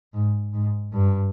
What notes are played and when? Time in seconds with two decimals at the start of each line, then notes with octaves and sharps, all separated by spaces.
0.13 G#2
0.53 G#2
0.93 G2